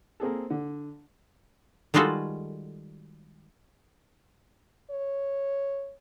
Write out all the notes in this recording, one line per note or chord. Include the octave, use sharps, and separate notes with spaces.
A#3 C4 G#4 A4
D3
D#3 G3 G#3 F4 F#4 A4
C#5